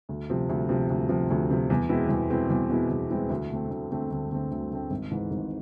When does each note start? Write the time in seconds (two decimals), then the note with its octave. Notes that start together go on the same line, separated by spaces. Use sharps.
0.09 D2
0.30 C3 F3
0.49 D2
0.69 C3 F3
0.90 D2
1.09 C3 F3
1.30 D2
1.50 C3 F3
1.70 E2
1.89 B2 G#3 C4 E4
2.09 E2
2.30 B2 G#3 C4 E4
2.50 E2
2.70 B2 G#3 C4 E4
2.90 E2
3.10 B2 G#3 C4 E4
3.30 D2
3.50 D3 A3 C4
3.70 D2
3.90 D3 A3 C4
4.11 D2
4.30 D3 A3 C4
4.51 D2
4.70 D3 A3 C4
4.90 G#1
5.11 G#2 E3
5.30 G#1